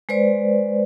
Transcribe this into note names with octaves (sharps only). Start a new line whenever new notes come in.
G#3 B4 C5 D5